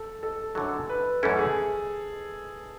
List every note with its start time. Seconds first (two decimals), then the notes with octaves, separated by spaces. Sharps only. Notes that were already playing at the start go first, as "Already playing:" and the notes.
Already playing: A4
0.23 A4
0.55 F#2 D3 F#3 A4
0.89 B4
1.23 F#2 E3 A3 C#4 E4 A4
1.39 G#4